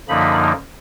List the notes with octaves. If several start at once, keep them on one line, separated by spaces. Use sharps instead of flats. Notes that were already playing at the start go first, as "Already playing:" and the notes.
F#2 D3 F3 A#3 D#4 B5